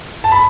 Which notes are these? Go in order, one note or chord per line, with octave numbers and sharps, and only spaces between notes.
A5
B5